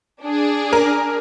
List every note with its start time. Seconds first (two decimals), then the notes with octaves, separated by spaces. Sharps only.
0.22 D4 G#4
0.73 A#4